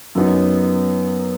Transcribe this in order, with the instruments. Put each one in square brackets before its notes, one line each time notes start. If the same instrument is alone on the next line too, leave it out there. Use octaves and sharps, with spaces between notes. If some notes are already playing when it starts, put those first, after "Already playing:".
[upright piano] F#2 F#3 B3 D#4